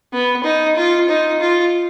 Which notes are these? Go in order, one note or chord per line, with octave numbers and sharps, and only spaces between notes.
B3
D#4
F4
D#4
F4